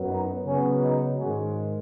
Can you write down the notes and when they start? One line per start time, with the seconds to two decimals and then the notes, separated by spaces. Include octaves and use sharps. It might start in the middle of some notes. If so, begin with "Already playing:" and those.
Already playing: F#2 F#3 B3
0.10 D#4
0.45 C#3 F#3 B3 C#4
0.82 D#4
1.18 G#2 D#3 G#3 C#4 F#4